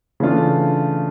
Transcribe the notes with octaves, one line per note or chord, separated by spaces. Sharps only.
C#3 E3 A3 D4 F4